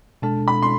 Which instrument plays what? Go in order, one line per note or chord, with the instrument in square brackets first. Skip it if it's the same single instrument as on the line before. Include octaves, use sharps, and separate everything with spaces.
[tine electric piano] B2 G#3 D4 A4 [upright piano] A5
[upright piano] B5
C6